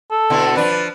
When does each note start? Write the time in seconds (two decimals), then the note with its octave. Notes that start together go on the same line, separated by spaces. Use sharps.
0.11 A4
0.30 B2 D3 E4
0.57 F3 D4 B4